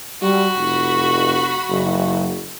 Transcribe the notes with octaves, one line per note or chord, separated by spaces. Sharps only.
G3 F#4 B5
F1
F#1